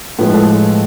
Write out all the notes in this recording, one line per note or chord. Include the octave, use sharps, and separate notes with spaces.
A2 F3 G#3 B4
A4